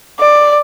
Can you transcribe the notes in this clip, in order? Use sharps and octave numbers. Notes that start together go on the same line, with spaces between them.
D5